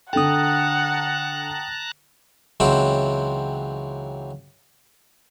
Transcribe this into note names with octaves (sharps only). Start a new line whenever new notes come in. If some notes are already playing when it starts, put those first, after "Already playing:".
D3 A4 F#5 G5 A5 A#5 D#6 F#6
C#2 E3 F#3 C4 C5 G5